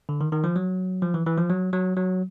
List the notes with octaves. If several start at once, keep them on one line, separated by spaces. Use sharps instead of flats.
D3
D#3
D#3
F3
F#3
F3
E3
E3
F3
F#3
F#3
F#3